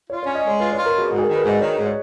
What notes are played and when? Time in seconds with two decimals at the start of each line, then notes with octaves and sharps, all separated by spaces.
0.10 F4 C#5
0.23 C#5
0.26 C#4
0.35 D#5
0.44 G#3 C#5
0.60 F4 B4
0.73 C#5
0.77 F4
0.86 A#4
0.94 B2 G#4
1.11 G#2 F#4
1.18 G#4
1.23 A#4
1.28 D#3
1.36 B4
1.45 G#2 D#5
1.61 D#3 C#5
1.78 G#2
1.87 C#5